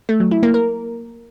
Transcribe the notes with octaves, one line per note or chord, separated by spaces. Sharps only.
A3
F#3
E4
A#3
A#4